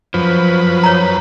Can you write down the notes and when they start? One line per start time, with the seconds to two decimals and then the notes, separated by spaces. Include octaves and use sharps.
0.14 F#2 F3 B4
0.83 C#5 A#5